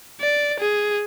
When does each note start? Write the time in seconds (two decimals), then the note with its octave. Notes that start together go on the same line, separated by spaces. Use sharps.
0.21 D5
0.60 G#4